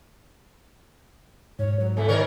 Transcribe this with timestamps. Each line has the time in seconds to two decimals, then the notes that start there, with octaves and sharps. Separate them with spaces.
1.59 G#2 C#5
1.80 F#3
1.97 E2 E3 A4
2.08 D#3 A#4 C#5 D5